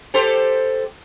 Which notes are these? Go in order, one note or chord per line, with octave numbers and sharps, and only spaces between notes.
G4 A4 C5